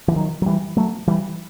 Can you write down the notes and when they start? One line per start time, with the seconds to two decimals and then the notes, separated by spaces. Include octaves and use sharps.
0.08 E3
0.16 D#3 F#3
0.42 F#3
0.46 E3 G3
0.77 F#3 A3
1.07 E3 G3